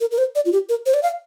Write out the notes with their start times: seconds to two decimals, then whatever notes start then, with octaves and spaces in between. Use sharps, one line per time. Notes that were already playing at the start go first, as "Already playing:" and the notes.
0.01 A#4
0.11 A#4
0.18 C5
0.35 D5
0.45 F4
0.52 G4
0.69 A#4
0.86 C5
0.94 D5
1.03 F5